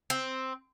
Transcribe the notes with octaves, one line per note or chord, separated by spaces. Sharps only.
C4